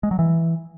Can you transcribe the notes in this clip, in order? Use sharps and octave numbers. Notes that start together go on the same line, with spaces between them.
G#3
F#3
E3